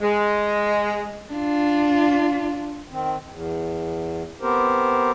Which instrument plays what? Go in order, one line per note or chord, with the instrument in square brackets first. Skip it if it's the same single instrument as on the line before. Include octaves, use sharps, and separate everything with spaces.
[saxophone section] G#3
[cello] D4 F4
[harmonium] D#3 C4
E2
B3 C4 G4 A#4 C5